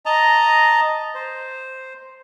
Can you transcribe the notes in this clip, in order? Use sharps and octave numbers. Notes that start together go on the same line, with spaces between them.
D#5 A5 A#5
C5